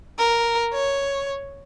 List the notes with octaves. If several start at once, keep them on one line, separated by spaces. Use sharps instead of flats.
A#4
C#5